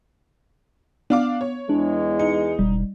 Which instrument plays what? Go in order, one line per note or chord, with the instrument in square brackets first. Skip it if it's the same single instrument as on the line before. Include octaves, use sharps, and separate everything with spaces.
[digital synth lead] B3 [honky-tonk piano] D4 F5 D6
[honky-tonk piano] C#5
[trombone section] E2 G#3 [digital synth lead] D4
[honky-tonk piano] D#4 [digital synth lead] C#7
[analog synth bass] E1 [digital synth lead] G3